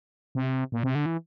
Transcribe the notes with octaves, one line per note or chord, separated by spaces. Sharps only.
C3
A#2
C3
D3
E3